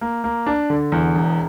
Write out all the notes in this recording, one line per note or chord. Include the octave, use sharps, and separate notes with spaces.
A#3
A#3
D4
D3
E2
E1